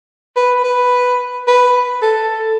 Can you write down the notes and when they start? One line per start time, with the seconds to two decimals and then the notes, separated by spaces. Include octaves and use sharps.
0.36 B4
0.64 B4
1.48 B4
2.02 A4